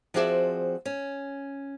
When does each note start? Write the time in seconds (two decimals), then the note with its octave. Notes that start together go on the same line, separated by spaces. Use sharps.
0.14 F3 C4 F#4 G#4 D5 E5
0.85 C#4